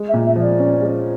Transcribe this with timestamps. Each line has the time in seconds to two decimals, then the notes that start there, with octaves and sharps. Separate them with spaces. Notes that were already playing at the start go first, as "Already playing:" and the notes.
Already playing: G#3
0.09 E5
0.14 A#2
0.26 E5
0.36 F3
0.41 D5
0.59 C#4
0.82 G#3